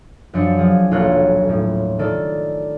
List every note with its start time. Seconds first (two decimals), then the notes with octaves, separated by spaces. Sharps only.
0.33 F#2 F3 D4 C#7
0.58 F3 G#4
0.91 D#1 B1 F4 A4 C#5 F#6
1.49 A2
1.99 D#3 A4 D5